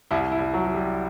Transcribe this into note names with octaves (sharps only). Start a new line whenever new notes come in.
C2 E4
E4
C2
F#3
F#3
G3